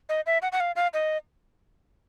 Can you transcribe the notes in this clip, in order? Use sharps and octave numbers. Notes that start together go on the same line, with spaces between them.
D#5
E5
F#5
F#5
F5
F5
D#5